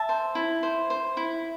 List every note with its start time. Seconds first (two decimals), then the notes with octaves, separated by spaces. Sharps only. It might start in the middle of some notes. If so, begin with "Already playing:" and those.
Already playing: E5 A5
0.09 C5
0.35 E4
0.63 C5
0.90 C5
1.17 E4